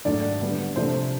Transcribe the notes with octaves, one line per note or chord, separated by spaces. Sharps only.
G#2 D#3 F#3 A3 D4 D5
D3 G3 B3 D4
C3 F3 A3 D4 C5